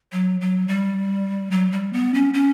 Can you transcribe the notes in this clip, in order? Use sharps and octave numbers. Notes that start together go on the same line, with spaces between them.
F#3
F#3
G3
F#3
G3
B3
C#4
C#4